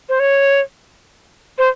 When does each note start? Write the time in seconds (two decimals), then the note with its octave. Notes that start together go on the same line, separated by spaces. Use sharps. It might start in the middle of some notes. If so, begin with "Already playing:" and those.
0.09 C5
0.20 C#5
1.58 C5